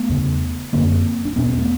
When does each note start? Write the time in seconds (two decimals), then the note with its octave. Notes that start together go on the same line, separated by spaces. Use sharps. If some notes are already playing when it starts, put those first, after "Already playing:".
Already playing: A3 B3
0.09 E2 C#3
0.73 F#2 D3 A#3 C4
1.25 D4
1.36 E2 B2 B3 C#4
1.50 C4
1.58 A3 B3